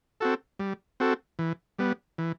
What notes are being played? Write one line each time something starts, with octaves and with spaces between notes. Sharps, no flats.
C4 F#4 A4
G3
C4 F#4 A4
E3
G3 B3
E3